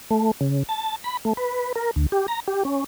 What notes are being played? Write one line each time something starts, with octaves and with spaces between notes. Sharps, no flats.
A3
C#3
A5
B5
A3
B4
A#4
D2
G4
A#5
G4
C#4